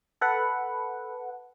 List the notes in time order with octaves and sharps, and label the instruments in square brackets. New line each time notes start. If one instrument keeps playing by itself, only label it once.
[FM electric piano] A4 B4 F#5